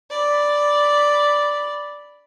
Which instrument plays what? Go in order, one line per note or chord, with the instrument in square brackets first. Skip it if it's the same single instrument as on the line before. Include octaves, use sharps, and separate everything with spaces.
[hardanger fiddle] D5 B5